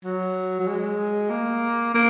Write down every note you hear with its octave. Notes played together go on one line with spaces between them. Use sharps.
F#3
F#3
G#3
A#3
A#3